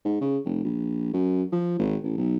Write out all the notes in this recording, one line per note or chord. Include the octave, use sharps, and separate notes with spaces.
G#2
C#3
F1
A#1
F#2
F3
G#1
A1
B1